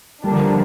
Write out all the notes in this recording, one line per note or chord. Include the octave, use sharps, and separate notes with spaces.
D3 F3 G3 A#3 D4